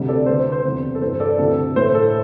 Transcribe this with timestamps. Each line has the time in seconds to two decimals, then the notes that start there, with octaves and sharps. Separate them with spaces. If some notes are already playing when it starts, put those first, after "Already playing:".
Already playing: D2 C3 G3
0.08 A4 D5
0.26 D2 D3 A3 C5
0.39 C5
0.52 C5
0.64 E2 C3 E3 G3
0.95 A4
1.01 G2 E3 A3 C5
1.20 A4 D5
1.38 D2 C3 E3 A4
1.76 A2 A3 C5
1.95 A4